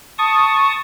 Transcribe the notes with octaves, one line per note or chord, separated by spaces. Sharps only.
A5 C#6 D#6